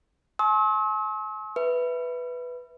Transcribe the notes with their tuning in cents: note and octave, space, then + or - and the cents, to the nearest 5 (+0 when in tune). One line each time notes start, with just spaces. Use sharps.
G#5 +45 C6 +45 E6 -45
B4 +0 E5 +0